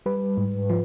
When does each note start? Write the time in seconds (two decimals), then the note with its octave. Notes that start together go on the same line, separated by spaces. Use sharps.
0.06 G3 B4
0.37 G#2
0.70 F3